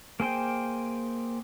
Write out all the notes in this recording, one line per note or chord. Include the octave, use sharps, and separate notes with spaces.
A#3 G#4 C5 G5